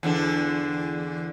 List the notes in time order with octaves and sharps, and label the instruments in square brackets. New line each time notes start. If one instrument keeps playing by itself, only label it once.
[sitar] E2 D3 D4